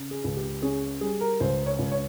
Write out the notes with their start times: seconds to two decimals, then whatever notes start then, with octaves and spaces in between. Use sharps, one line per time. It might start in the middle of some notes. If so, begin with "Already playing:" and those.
Already playing: C#3
0.11 G#4
0.24 C#2
0.37 G4
0.62 C#4 G#4
1.01 G3 G#4
1.21 A#4
1.40 C#2 C5
1.66 C#5
1.79 C#2
1.92 C#5